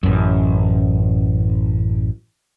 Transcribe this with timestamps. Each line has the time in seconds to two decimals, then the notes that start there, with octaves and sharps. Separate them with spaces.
0.03 A1 F#2